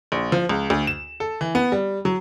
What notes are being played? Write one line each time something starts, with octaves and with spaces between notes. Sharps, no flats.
A#1
F3
C#2
D2
E7
A4
E3
B3
G3
F#3